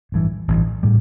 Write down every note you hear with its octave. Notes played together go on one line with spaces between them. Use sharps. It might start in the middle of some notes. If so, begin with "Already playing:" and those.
A1 G2 E3
A1 G2 E3
A2 G3